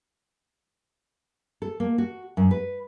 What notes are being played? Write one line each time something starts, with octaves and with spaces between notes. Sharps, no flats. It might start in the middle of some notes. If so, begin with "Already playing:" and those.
A4
A#3
F#4
F#2
B4